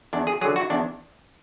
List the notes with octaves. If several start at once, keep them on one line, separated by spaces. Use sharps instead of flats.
E2 D4
G#4
D3 F#3 G#4
F#4
E2 D4